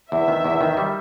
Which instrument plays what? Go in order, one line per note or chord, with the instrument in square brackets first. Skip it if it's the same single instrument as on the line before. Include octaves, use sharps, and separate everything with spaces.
[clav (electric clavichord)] E2 [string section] E5
[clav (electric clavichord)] D#3
E2
D#3
G3